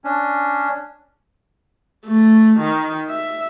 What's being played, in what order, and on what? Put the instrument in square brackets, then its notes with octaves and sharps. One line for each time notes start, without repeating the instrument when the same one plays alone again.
[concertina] C#4 D4
[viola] A3
D#3
E5